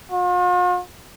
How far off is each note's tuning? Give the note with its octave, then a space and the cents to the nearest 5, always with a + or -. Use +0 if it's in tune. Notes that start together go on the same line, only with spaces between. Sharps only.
F4 +45